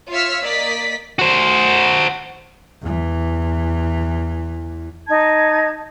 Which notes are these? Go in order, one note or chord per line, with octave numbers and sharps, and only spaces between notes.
F4 C#5 E5 E6 F6 B6
A#3 D5 D#5 B6
F#4 C5
E2 E3
D#4 A5 G#6